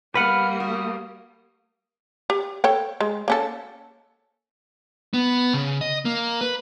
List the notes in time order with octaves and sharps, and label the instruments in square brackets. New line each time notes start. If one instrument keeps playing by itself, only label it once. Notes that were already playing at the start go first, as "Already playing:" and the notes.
[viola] G3 A#3 [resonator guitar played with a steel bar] B3 [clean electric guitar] B4 F#5 [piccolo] F6
[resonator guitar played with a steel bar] F#4 [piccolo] D#6
[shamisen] G4
A4 C#5 G5
G#3
A#3 C#4 A4
[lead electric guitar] B3
C#3
D#5
A#3
B4